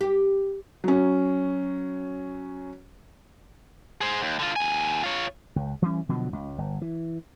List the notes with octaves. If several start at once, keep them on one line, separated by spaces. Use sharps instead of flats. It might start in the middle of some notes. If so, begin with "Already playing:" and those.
G4
F#3 C#4
G#4 C5
D#2
D3 F4
D#2 G#5
F4 C#5
C#2
E3 G3 C#4
B2 D3 F3 F#3
C#2
G1
E3